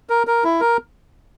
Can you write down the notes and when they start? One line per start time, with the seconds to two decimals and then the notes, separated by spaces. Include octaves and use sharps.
0.10 A#4
0.27 A#4
0.44 E4
0.60 A#4